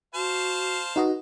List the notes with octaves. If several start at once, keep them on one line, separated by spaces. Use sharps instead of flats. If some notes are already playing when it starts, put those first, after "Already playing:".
F#4 C5 F5 A5
D#4 F#4 B4 D#5